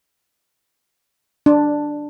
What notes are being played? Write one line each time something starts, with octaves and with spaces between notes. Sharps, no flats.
D4